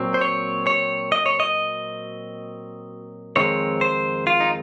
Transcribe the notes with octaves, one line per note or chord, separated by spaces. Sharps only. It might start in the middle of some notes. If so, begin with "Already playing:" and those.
Already playing: A#2 F#3 C4
C5
C#5
C#5
D#5
C#5
D#5
F2 D#3 G#3 C4 C#5
C5
F4
D#4